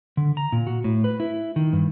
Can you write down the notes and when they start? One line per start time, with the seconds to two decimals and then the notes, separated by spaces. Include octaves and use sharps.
0.17 D3
0.37 A#5
0.52 A#2
0.67 F#4
0.84 A2
1.04 B4
1.20 E4
1.56 D#3
1.73 G2